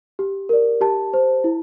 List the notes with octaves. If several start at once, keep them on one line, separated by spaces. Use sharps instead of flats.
G4
A#4 D5
G4 A5
C5
E4